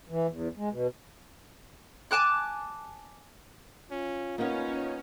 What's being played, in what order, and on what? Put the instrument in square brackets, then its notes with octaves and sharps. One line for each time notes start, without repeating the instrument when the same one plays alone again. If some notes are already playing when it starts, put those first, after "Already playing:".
[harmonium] E3
E2
G#3
B2
[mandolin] G#5 A5 D6 F#6
[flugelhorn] C#4 [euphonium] F4
[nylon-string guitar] A#3 B3 [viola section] C#4 [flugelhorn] D#4